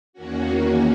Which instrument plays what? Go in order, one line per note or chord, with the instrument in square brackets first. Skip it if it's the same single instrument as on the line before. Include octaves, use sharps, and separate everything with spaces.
[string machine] E2 D#3 A#3 C#4 F#4